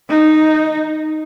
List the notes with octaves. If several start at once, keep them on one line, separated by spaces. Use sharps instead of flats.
D#4